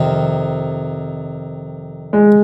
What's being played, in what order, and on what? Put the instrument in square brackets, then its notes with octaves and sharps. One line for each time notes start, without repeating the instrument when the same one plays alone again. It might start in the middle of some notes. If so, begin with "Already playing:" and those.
Already playing: [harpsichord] F2 C3 D#3
[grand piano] G#3